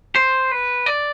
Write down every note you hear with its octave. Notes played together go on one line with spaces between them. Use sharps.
C5
B4
D5